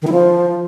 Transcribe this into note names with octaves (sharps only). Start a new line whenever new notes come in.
D#3
E4
F3